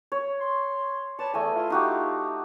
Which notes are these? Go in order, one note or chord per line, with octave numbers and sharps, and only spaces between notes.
C#5
C6
B4 C#5 D5 A5
E2 A3 D#5 G#5
E4 F4
D#4 F#4 G4